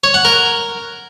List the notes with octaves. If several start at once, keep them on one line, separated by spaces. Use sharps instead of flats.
C#5
F#5
A#4